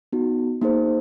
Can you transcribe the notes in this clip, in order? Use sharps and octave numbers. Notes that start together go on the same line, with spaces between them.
B3 D#4 F#4
A#3 D#4 G#4 C5